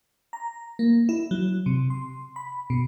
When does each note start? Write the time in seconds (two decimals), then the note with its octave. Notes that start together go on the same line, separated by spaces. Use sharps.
0.33 A#5
0.79 A#3
1.09 E4
1.31 F#3
1.66 C3
1.90 C6
2.36 B5
2.70 B2